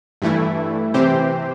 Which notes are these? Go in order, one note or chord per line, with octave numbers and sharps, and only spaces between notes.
G2 E3 A3 E4
C3 E3 C4 G4 C5